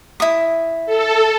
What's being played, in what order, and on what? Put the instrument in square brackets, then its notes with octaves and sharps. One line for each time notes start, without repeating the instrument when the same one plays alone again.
[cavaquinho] E4 D#6
[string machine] A4